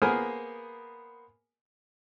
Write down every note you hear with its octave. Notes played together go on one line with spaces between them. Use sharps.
A#3 B3 G#4 A#4 C5 G#5